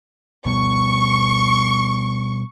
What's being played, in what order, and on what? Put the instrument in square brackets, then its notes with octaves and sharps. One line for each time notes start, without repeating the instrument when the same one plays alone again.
[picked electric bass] B2 G3 B3 [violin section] C#6